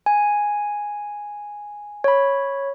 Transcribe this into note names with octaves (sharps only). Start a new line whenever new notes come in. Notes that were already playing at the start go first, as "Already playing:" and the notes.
G#5
C#5 B5